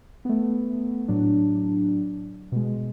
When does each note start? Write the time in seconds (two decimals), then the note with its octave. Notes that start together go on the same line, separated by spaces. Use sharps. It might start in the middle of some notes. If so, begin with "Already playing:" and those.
0.25 A3 B3
1.08 A2 F#3 D4
2.52 B2 G#3